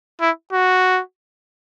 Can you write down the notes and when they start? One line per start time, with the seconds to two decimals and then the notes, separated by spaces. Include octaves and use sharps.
0.21 E4
0.53 F#4